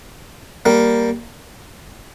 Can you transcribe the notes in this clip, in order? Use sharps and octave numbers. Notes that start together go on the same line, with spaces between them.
G3 A#3